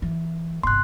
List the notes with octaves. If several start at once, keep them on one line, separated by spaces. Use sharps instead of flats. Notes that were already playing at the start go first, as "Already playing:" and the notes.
E3
G1 C3 C6 F#6